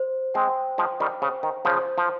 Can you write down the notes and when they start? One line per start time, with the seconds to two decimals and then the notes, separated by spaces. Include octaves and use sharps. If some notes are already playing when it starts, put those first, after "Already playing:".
Already playing: C5
0.34 G#3 C4 G5
0.78 F3 G#3 C5
1.00 D#3 G3
1.22 C#3 C5
1.43 D#3
1.65 C#3 F3 C5
1.98 F3